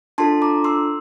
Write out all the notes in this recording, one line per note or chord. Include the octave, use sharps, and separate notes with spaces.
D4 F4 A4 A5 C6
A#5 D6
C6 E6